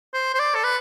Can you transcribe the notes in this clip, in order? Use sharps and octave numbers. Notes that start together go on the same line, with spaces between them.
C5
C5
D5
A4
B4